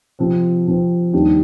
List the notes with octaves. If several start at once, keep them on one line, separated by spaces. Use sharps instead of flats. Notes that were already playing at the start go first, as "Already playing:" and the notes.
C3 F3 C4
C3 F3 C4
D#2 D#3 G3 D4 G4